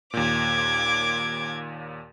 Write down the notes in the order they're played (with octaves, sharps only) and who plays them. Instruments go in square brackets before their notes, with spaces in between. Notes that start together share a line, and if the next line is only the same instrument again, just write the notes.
[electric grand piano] D#2 A#2 [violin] D6 G#6